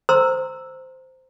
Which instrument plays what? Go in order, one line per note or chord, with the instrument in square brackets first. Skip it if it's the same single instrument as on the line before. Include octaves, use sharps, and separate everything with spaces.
[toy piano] C5 A#5 C6 E6